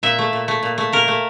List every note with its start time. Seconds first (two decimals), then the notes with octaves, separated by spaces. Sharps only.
0.03 A#2 E5
0.19 A3
0.33 A#2
0.48 A3
0.63 A#2
0.78 A3
0.93 A#2 A#4
1.08 A3